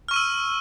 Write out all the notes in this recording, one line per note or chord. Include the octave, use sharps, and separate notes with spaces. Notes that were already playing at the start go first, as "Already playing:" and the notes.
C#6 E6 F6 D#7